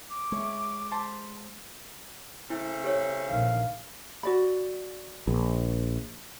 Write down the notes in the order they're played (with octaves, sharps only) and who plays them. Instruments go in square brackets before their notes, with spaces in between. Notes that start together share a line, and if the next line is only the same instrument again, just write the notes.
[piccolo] D6
[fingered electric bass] G#3 [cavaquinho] C#5 E5
[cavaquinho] C5 A5 B5
[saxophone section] C#3 A3 C4 [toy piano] E4
[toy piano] G4 A4 C#5
[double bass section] A#1 D#3 [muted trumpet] F5
[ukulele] F#4 D5 B5
[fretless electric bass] A#1